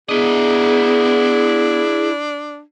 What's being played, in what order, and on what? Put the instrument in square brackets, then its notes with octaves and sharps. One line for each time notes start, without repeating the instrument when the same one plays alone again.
[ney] B3 [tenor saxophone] D4 [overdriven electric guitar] E4 D#5 [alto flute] G#4